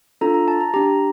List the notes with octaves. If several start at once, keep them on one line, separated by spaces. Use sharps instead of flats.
D4 F4 A4 A#5
A#5
A5
A#5
D4 G4 A#5